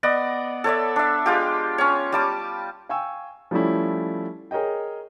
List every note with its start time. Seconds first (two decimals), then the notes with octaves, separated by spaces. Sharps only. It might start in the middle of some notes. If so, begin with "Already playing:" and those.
0.03 B3 D5 D#5 F#5
0.64 A4 C#5 D5 E5
0.96 D4 E5
1.26 G#3 F4 G4
1.78 C#4 C#5
2.12 G3 A5 D6
2.89 F5 G5 G#5 C#6 E6
3.51 F3 G3 A3 C#4 E4
4.51 G#4 A#4 C#5 D#5 G5